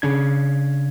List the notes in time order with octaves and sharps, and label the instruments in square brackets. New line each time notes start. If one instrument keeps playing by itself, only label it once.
[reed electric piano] C#3 D4 G#6